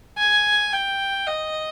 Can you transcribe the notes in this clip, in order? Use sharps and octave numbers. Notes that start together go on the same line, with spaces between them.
G#5
G5
D#5